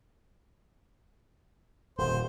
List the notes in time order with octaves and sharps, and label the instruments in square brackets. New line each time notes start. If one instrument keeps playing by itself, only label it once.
[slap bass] D#1 [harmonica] C5